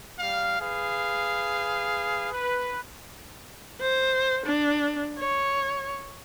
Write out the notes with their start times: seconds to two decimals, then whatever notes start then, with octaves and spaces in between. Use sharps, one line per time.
0.19 G3 F5
0.60 G#4 B4 F5
2.32 B4
3.81 C5
4.46 D4
5.19 C#5